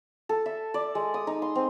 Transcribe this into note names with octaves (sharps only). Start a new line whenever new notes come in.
A4
E5
D5
G#3
D#6
D#4
C6
C4